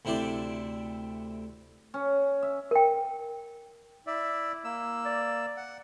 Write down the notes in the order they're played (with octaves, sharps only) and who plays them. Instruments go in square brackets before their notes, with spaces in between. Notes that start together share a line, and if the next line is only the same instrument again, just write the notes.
[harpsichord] D2 C3 E4 C5 D5 D6
[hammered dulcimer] C#4
E5
[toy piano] A#4 G5
[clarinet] E4 [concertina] D5 E5
[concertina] A#3 E6
[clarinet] D5
[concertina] F#5